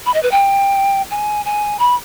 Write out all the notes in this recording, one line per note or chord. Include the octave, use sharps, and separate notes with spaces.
B5
D#5
B4
G5
G#5
G#5
B5